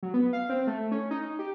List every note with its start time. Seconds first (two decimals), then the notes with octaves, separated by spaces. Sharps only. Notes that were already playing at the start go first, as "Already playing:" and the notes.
0.03 F#3
0.14 B3
0.33 F5
0.49 C4
0.67 A3
0.92 C#4
1.11 D#4
1.39 G4